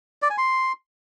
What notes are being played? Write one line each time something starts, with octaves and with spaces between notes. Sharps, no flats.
D5
G#5
C6